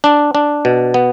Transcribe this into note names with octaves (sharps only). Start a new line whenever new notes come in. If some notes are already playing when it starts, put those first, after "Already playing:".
D4
D4
B2
B3